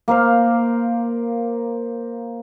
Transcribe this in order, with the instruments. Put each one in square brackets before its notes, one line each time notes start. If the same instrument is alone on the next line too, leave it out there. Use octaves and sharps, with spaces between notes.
[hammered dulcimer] A#3 A#4 C5 F5